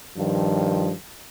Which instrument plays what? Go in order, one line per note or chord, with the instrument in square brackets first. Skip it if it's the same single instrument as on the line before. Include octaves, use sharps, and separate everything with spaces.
[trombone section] G2 D#3 F3